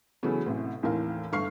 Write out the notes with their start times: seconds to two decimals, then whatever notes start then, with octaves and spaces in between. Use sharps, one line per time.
0.23 C#3 E3 F#3 A3 B3
0.46 A1 A2 C3
0.83 D#2 A2 E3 C4 A#4 F5
1.32 G1 A3 F5 C#6 F6 C7